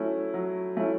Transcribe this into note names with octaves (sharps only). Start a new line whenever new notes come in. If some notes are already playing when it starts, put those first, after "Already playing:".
Already playing: F#3 A3 C#4 E4
F#3
A3 C#4 E4